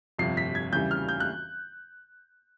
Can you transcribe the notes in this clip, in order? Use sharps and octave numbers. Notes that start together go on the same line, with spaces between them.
G1 F2 C3 F3 C7
B6
G#6
E2 C#3 E3 G3 G6
F6
G6
F#6